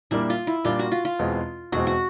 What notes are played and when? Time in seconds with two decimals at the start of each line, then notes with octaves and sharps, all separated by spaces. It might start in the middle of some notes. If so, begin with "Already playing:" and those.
0.11 A#2 G3 A#3 D4 E4
0.30 F4
0.47 E4
0.65 A#2 G3 A#3 D4 F4
0.79 F#4
0.92 F4
1.05 F4
1.19 E2 B2 G#3 C4
1.72 E2 B2 G#3 C4 F#4
1.87 F#4